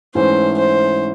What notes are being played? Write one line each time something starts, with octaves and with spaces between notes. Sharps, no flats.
G#2 E3 A3 C#4 C5
C5